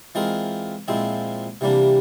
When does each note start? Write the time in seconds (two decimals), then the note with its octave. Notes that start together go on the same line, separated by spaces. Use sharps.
0.15 E3 G#3 C4 F4 A#4
0.88 A#2 F3 G#3 C4 E4
1.61 C3 E3 G3 A#3 D4